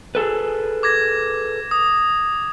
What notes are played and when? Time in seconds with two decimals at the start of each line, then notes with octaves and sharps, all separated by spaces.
0.15 G#4 A4 B4
0.83 D6 G#6 A#6
1.71 D#6